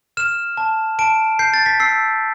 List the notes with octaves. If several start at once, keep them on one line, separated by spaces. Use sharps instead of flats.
F6 E7
A5
A5 D7
G6 C7
A6
B6
E6 C7